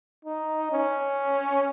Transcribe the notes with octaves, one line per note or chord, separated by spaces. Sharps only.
D#4
C#4